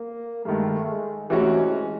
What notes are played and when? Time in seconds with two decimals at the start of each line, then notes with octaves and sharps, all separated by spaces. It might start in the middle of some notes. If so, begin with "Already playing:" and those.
Already playing: A#3
0.45 G2 D#3 G#3 A3
0.88 G#3
1.29 C3 E3 G#3 A3 C#4 F#4